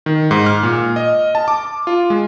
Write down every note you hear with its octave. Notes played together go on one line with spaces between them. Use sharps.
D#3
G#2
F6
A#2
D#5
A5
D6
F4
G#3